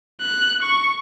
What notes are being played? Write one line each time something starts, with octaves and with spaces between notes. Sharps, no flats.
F#6
C#6